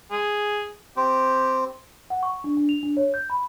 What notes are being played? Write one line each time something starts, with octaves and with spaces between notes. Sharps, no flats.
G#4
C4 G4
F#5
C#6
D4
D4
F7
D4
C#5
G6
B5